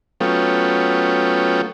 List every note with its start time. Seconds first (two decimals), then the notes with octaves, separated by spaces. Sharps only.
0.21 F#3 A3 B3 C#4 F4 G5